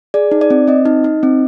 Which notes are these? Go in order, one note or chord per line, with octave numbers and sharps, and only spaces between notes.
G#4 D5
D#4
D5
C4
C4 D#5
D#4
D#4
C4